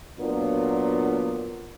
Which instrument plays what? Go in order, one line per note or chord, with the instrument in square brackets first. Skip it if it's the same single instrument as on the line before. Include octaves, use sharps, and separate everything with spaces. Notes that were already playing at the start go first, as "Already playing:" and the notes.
[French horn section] A#2 F#3 B3 D4 F4 A#4